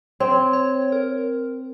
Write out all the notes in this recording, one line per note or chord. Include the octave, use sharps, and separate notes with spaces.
C4 C#5
C#5
A#4